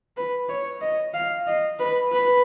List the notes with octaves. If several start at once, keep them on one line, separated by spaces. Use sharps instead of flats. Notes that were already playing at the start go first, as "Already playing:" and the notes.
B4
C#5
D#5
F5
D#5
B4
B4